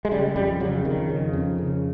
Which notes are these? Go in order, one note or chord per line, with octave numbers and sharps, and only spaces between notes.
G#3
C#3 G3
F2 G3
C#3 F#3
F2 D#3
C#3
F2
C#3